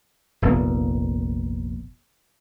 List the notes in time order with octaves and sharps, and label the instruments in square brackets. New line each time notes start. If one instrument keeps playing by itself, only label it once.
[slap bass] F1 A#1 F2 B3